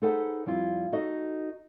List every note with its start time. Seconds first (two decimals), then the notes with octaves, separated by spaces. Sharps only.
0.02 D#4 G#4 A4 B4 C5 F#5
0.46 F2 G3 E4 F4
0.92 D#4 F#4 A4 D#5